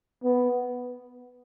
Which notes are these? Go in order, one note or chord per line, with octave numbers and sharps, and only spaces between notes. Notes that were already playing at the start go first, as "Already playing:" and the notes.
B3